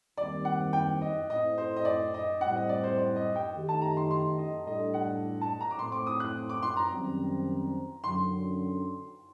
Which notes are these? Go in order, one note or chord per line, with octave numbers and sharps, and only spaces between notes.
D#2 D#3 G3 C4 D5
F#5
G5
D#5
A2 A3 C4 D#5
C5
D#5
D5
D#5
A2 G3 C4 F#5
D#5
D5
C5
D5
D#5
G5
D#3 A3 D#4 G4
A5
A#5
C6
C6
D#5
A2 G3 D4 A4 D#5
F#5
A5
A#5
D6
A2 A3 C4 C6
D6
D#6
F#6
D6
C6
A#5
F#2 D#3 G3 C4
F#2 D3 F#3 C6